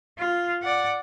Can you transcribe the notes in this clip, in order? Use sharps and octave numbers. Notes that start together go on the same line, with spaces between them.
F4
D5 F#5